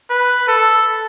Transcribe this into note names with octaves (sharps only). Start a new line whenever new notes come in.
B4
A4